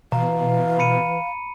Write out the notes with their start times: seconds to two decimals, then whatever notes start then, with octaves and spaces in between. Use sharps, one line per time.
0.12 B2 E3 F5 A#5
0.79 B5 C#7 D#7